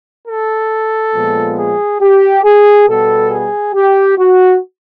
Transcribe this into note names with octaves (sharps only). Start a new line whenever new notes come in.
A4
A#2 F3 G#3 B3
G#4
G4
G#4
B2 G3 B3 A4
G#4
G4
F#4